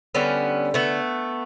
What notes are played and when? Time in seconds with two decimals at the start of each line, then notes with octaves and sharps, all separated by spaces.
0.15 D3 G3 B3 C#4
0.74 A3 B3